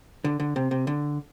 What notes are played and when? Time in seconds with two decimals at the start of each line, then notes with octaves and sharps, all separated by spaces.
0.24 D3
0.40 D3
0.56 C3
0.71 C3
0.87 D3